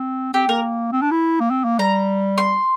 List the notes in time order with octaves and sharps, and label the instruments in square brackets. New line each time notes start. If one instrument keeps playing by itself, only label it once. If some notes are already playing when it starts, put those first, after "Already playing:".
Already playing: [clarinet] C4
[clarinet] C4 [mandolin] G4
[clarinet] A#3 [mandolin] A#4
[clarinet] C4
D4
E4
A#3
C4
A#3
[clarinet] G3 [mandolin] A#5
[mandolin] C6